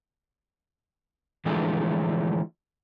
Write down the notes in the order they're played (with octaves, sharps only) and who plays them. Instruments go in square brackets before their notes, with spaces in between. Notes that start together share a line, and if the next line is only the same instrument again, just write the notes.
[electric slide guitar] D3 E3 F3 G#3 A3 D4